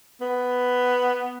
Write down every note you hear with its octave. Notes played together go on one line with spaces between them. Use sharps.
B3